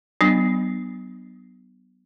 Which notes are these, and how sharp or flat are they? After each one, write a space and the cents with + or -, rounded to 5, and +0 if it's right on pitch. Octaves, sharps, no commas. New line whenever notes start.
F#3 +35 B3 +0 D4 +35